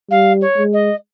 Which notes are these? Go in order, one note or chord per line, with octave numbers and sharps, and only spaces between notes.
G3 F5
C#5
G#3
D#5